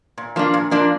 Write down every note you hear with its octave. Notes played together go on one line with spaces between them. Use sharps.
A#2
F3 A#3 D4
A#2
F3 A#3 D4